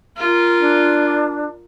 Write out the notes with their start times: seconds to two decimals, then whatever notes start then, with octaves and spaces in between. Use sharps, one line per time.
0.17 F4 A#4
0.59 D4